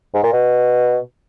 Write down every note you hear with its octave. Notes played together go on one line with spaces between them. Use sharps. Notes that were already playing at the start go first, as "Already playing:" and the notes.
G#2
A#2
B2